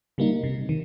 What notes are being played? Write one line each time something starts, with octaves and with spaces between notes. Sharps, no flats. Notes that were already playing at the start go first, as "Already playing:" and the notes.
C#3 G3 A#3 D#4
C3
D#3